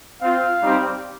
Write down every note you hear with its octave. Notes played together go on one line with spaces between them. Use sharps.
C4 F4 F5
G3 C4 D#4 G4